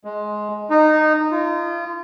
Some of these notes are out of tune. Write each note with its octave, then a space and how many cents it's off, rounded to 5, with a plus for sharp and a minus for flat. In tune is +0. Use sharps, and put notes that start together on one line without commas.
G#3 +15
D#4 -15
F4 -35